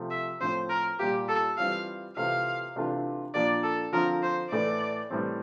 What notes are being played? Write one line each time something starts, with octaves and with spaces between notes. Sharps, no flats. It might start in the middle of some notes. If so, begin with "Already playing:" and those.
Already playing: C3 F3 A3
E5
A2 F3 C4 C5
A#4
A#2 G3 A#3 F4 G4
A4
E3 G3 C4 F4 F5
C3 E3 A3 C4 F4 F5
C3 E3 A3 D4 F4
A#2 F3 A#3 D4 D5
A4
D3 F3 C4 F4 A#4
C5
A2 E3 A3 D5
A2 E3 G3 C4